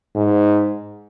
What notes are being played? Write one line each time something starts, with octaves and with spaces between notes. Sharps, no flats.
G#2